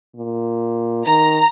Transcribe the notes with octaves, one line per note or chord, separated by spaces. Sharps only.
A#2
D#3 A#5